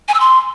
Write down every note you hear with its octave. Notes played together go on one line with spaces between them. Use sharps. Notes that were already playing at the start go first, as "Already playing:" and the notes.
G#5
E6
C6